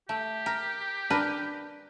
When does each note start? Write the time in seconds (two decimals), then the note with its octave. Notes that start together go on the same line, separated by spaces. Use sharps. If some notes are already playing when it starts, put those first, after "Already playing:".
0.09 A3 G4
0.46 A#4
1.10 D4 A#4 B4